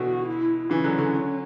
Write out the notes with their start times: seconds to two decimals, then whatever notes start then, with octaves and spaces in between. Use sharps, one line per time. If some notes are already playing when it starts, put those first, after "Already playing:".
Already playing: B2 D3 E3 F#4
0.28 E4
0.70 C#3 E3 C#4
0.84 D3 F#3
0.98 D3 F#3